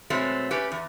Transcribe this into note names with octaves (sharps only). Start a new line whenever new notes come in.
B2 F#3 G#3 A3 C4
A3 C#4 G4 B4
E2